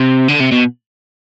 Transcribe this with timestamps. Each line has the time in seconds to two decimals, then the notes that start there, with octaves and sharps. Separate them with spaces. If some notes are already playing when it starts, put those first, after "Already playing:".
Already playing: C3
0.28 D3
0.40 C3
0.52 B2